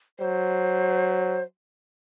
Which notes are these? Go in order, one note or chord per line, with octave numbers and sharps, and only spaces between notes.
F#3 C5